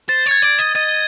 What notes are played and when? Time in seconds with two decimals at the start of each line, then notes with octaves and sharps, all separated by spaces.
0.09 C5 A6
0.26 C#5
0.31 G#6
0.42 D5
0.59 D#5
0.75 D#5 A6